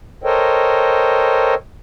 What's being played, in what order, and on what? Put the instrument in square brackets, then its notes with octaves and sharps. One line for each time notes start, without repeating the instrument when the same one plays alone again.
[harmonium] A4 A#4 C5 C#5 D#5 G5